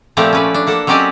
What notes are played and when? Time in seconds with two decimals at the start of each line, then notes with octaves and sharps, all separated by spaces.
0.17 A#2 F3 A3 C4 E4 G4
0.33 C#4 B4 D5
0.54 D4
0.67 A#3 A4 F#5
0.87 F#3 C4 C#4 G4 D5 D#5